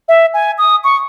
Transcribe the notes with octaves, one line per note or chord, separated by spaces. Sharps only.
E5
G#5
D#6
C#6